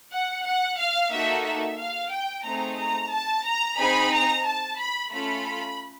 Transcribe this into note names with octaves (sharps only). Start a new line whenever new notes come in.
F#5
F#5
F5
A#3 D#4 F#4 A4 E5
E5
F5
G5
A3 C4 D#4 G#4 A#5
A#5
A5
A#5
C4 D#4 G#4 B5
A#5
A5
B5
A3 C#4 F4 A4 B5